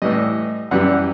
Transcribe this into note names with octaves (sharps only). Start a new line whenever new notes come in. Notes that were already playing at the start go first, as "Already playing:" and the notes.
A2 E3 G3 D#5
F#2 E3 G3 F#5